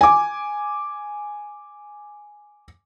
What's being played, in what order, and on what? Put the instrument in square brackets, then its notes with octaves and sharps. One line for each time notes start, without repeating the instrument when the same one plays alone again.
[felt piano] G#5 D6